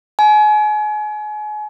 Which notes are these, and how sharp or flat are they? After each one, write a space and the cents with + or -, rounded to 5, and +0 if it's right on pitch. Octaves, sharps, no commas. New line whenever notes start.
G#5 +35